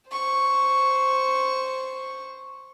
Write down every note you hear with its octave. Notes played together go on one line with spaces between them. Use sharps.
C5 C#6